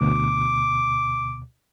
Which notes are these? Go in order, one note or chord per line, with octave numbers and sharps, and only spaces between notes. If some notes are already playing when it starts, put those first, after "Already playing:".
D2 B2 D6